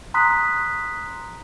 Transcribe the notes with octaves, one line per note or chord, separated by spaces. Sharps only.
A#5 C6 D#6 F#6 B6